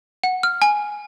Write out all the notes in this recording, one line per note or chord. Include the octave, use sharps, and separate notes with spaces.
F#5
F6
G#5